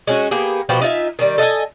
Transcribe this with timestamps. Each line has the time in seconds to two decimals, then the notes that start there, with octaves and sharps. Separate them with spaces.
0.07 G#3 C#4 F#4
0.31 A#3 B3 G4 G#4
0.69 B2 F3 F#4 G4
0.81 D#4 F4 E5 G#5
1.19 D#3 G3
1.38 A4 D#5 F5 G#5